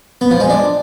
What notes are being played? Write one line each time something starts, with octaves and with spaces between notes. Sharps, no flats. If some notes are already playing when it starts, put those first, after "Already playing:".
B3
F3
G#3
D4